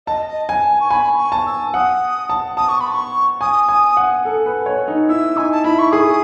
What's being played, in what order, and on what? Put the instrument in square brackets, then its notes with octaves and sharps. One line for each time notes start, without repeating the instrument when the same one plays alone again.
[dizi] D#5 [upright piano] A5
[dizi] D#5
[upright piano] G#5
[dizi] A5
G#5
C#6
[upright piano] G#5 [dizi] B5
[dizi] C#6
[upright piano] A5
[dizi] E6
[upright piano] F#5 [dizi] D#6
[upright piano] A5
[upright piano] A5 [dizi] D#6
[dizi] C#6
B5
C#6
[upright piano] G#5 [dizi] D#6
[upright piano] G#5
F#5
A4
B4
C#5
D#4
[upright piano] E4 [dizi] E6
[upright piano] D#4 [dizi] G#5
[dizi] A5
[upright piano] E4 [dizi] B5
[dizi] C#6
[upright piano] G#4 [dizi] D#6